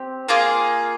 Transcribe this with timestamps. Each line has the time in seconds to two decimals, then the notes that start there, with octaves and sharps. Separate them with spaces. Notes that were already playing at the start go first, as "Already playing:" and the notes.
Already playing: C4 G4
0.29 A#3 F4 G#4